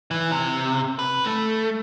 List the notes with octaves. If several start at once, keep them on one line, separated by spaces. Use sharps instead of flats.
E3
C3
B4
A3